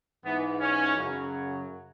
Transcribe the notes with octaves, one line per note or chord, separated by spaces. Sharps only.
G#2 E3 B3
C#4
F#2 C#3 F#3